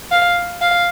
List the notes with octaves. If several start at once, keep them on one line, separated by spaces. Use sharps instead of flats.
F5
F5